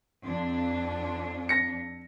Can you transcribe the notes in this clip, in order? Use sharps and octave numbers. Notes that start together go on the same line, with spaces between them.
F2 D4
A#6 C#7